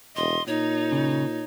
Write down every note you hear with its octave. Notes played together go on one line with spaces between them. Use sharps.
E1 D#5 C6
A#2 D#4 C#5
C#3